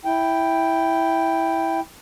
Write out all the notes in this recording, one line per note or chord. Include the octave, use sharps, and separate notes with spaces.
E4 G5